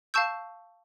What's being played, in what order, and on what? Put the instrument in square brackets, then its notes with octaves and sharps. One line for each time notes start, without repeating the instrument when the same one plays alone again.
[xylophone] F5 A5 C#6 E6 G6